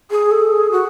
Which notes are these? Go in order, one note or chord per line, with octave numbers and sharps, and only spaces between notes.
G#4
A4
G#4
F#4